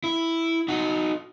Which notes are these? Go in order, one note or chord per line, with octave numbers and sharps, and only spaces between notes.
E4
D#4 F#4